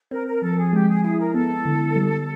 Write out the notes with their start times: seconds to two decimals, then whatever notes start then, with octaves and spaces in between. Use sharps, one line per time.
0.11 C4 A#4
0.27 A#4
0.42 F3 A4
0.58 G#4
0.73 G#3 G4
0.89 G#4
1.04 E4 G#4
1.20 A#4
1.34 B3 A4
1.65 D3
1.96 G3